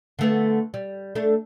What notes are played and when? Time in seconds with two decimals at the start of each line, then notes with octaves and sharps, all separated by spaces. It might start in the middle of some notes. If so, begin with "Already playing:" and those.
0.19 D3 A3 B3
0.74 G3
1.15 A3 D4